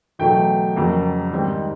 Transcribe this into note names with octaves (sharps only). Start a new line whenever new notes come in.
E2 B2 F#3 A3 G5
F2 C#3 F#3 A#3
G#2 D#3 G3 C4